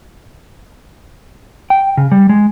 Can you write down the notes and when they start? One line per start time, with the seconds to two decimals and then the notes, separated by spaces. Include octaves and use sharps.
1.70 G5
1.97 C#3
2.12 G3
2.29 G#3